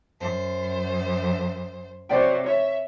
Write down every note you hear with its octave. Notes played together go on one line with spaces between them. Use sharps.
F#2 C5
C3 F#3 C5 D5 G5
C#5 E5